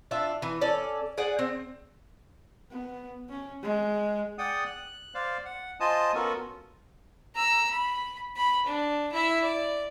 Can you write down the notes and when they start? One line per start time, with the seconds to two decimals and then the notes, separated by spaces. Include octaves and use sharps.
0.11 D4 F4 E5
0.42 E3
0.61 C#4 A4 D5
1.17 G#4 D5 F#5
1.39 C4
2.71 B3
3.29 C#4
3.63 G#3
4.38 G#4 D5 F#5 G5 D#6
4.65 F#6
5.14 C5 D5 F5
5.45 F#5
5.80 F4 C5 D#5 G#5 A5 D#6
6.15 B3 C#4 F4 F#4 A4 A#4
7.35 A#5 E6
7.71 B5
8.36 B5
8.66 D4
9.12 E4 E5
9.42 D5